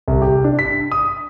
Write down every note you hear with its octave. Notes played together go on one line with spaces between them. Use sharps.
C2
G4
D4
B6
D#6